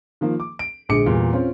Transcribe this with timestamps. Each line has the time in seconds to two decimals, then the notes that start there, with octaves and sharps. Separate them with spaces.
0.21 D#3 F3 A#3
0.40 D6
0.59 D7
0.89 A#1 D3 G#3 G#4 D6 C#7
1.06 E2 A#2 G3
1.33 C4 C#4 F4